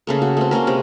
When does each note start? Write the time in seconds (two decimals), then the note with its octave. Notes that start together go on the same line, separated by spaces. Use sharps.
0.07 C#3 A3 A#3
0.22 F#4
0.37 A3 C4
0.51 A#3 C4 C#4 A#4
0.67 C3 G#3